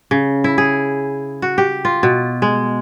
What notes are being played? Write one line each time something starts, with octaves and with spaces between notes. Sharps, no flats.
C#3
E4
G#4
F#4
G4
F4
B2
G#3